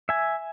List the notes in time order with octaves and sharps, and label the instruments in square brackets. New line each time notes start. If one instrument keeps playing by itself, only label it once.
[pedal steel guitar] E5 G#5